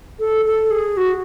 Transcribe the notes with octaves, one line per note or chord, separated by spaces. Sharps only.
A4
A4
G#4
F#4